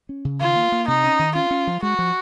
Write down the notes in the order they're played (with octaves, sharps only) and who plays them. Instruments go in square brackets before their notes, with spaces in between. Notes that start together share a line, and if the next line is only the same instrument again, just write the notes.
[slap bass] C#4
C#3
[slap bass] D#3 [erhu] F4
[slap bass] A#3
A#3
[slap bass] C3 [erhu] D#4
[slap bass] C#4
D#3
[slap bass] C#4 [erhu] F4
[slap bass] C#4
F3
[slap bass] G#3 [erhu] F#4
[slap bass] F3